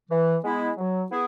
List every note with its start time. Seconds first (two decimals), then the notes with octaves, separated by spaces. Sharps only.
0.10 E3
0.43 G#3 B3 E4
0.77 F#3
1.11 B3 E4 G#4